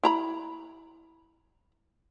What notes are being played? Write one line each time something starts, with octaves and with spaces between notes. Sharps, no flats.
E4 A#5 B5